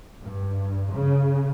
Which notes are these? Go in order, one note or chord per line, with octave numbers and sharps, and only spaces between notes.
G2
C#3